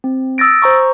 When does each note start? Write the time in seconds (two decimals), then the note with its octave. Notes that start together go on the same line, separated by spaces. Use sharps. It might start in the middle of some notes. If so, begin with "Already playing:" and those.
0.04 C4
0.38 D#6 E6 A6 A#6 D7
0.62 C5 A#5 C#6